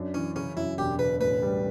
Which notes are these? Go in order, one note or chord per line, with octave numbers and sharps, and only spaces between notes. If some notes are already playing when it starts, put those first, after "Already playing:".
Already playing: F#2 D4
E3 C#4
C#3 C#4
F#2 E4
E1 G4
C#3 B4
A2 B4
G3